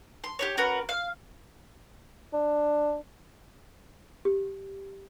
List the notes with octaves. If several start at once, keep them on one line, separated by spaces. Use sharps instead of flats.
C6
G4 B4 C#5
C#4 F#4 A#4 B4
F5
D4
G4